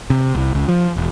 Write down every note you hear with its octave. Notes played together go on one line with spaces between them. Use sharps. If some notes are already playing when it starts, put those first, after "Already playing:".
C3
C2
C#2
F3
E1